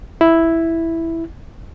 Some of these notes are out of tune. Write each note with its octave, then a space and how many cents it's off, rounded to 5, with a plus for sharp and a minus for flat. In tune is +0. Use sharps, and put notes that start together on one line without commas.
E4 +0